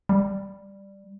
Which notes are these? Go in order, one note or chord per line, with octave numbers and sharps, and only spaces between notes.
G3